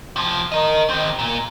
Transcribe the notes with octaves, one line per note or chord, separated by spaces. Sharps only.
C3 F3
A#4 D#5
D#3 C4
A#2